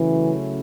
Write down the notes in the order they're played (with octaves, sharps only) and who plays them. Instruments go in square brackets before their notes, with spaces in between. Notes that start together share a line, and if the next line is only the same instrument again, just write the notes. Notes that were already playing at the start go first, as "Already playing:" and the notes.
Already playing: [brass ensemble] C#3 F#3 A3 C#4 E4 [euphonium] E3